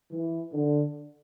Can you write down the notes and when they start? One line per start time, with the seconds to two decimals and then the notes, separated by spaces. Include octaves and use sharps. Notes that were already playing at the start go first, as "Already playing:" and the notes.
0.11 E3
0.53 D3